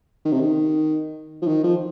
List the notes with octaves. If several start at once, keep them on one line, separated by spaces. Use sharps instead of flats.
D#3
C3
D#3
F3
D#3
F3